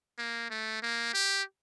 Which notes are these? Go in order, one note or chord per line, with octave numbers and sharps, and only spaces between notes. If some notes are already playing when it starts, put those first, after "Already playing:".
A#3
A3
A#3
G4